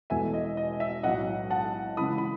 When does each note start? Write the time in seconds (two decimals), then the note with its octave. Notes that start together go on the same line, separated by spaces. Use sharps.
0.10 E1 E2 B2 A3 E5 G#5
0.34 D#5
0.57 D#5
0.80 E5
1.03 B1 A2 F#3 D#5 F#5
1.50 F#5 A5
1.97 C#2 C#3 E3 B5 D#6
2.18 B5